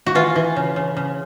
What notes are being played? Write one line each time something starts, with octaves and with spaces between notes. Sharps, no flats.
F#4
E3 F4
E3
C#3
C#3
C#3